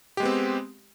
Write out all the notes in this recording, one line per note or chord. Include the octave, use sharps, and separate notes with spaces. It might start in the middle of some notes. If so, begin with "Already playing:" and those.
G#3 B3 C4 G4